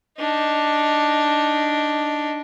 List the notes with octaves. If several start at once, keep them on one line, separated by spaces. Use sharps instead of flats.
D4 D#4